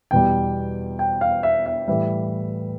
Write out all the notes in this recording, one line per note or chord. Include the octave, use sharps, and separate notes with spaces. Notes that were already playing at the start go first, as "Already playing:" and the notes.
E2 B2 G3 G5
G5
F5
E5
E5
A2 E3 G3 E5